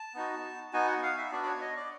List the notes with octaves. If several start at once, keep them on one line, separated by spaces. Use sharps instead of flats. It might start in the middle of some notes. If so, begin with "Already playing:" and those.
Already playing: A5
B3 D#4 F#4
B3 D#4 F#4 G#5
F#5
F5
E5
B3 D4 F#4 D5
D5
C#5
D#5
D5